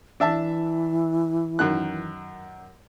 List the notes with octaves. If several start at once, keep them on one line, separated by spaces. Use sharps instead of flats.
E3 D4 E5 A5
F#2 D#3 F#6